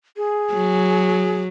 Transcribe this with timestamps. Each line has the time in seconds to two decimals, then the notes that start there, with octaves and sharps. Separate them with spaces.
0.17 G#4
0.54 F#3